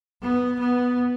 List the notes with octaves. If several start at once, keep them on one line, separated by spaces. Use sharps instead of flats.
B3
B3